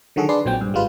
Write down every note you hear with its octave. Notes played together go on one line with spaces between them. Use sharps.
D3 D#3 F#3 F#4 G#4 A4
D4 G#4 B4 D5 C6
A#1 A#2 F#3 C4 G5
G2
G#1 G3 G#3 F4 B4